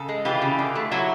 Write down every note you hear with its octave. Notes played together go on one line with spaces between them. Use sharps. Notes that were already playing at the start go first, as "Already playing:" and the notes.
Already playing: C#3 A4
G#3
E3 F4 G4
C#3
D3
A3
F#3 E4 F#4